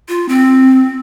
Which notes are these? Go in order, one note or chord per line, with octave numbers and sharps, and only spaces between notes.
F4
C4